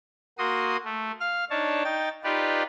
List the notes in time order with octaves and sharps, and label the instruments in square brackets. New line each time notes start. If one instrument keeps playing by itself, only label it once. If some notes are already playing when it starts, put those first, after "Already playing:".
[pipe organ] A#3 F#4 C6 D#6
A3
F5 F6
D4 D#4 C#5 A5
D#4 G5 A6
D#4 F4 G4 B4 D5